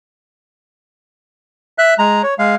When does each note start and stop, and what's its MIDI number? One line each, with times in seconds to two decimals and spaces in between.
1.78 1.94 76
1.78 1.94 90
1.99 2.22 56
1.99 2.22 82
2.23 2.34 73
2.39 2.55 56
2.39 2.55 77